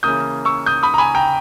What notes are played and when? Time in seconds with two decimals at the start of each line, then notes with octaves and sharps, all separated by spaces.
0.03 C#3 E3 A#3 C#4 D#6 G6
0.45 C#6 E6
0.66 D#6 G6
0.83 B5 D#6
0.94 A#5
0.98 G#5 B5
1.15 G5 A#5